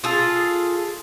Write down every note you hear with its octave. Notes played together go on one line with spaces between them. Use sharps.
F4 G#4 A4